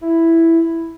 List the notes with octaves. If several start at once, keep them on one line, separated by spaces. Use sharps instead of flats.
E4